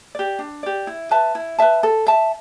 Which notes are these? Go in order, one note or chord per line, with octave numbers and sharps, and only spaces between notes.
G4 D5
D4
G4 D5
E4
B4 E5 A5
E4
B4 E5 A5
A4
E5 A5